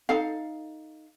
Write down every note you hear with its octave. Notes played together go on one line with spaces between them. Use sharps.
D#4 A4 F5